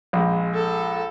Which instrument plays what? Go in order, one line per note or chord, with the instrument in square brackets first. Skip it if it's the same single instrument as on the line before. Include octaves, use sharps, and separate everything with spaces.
[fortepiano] A#1 G#3
[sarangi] A4